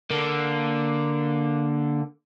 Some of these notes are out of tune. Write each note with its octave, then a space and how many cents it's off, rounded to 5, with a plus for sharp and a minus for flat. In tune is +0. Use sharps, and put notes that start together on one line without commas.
D3 +0 A#3 +0